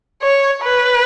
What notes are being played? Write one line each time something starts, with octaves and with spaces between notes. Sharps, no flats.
C#5
B4